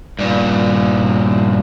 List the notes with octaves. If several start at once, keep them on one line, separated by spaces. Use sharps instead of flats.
G2 A#2